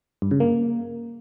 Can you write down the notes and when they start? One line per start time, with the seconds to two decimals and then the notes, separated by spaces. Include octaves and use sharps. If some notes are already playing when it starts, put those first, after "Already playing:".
0.22 G2
0.31 C#3
0.40 A#3